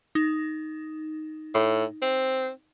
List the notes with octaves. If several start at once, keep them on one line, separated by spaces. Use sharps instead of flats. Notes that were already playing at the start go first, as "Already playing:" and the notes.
D#4
A2
C4